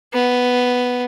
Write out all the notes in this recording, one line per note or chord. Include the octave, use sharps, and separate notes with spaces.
B3